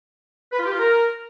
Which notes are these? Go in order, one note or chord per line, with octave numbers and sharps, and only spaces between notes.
B4
F4
G4
F4
A#4